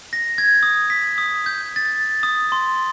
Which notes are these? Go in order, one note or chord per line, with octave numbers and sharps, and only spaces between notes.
A#6
G#6
D#6
B6
D#6
G6
A6
D#6
C6